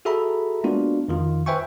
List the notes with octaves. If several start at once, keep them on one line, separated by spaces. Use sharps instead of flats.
F#4 G#4 A4 E5 A#5 B5
G#3 A#3 B3 D4 F4 F#4
F2 D#3 F4
B4 C5 E5 G5 G#5 C#6